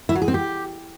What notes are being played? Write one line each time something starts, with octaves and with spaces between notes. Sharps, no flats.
E4
F#3
G#4
C4
G4